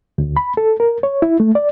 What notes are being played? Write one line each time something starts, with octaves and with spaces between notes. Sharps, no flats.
D2
B5
A4
A#4
C#5
E4
A3
D5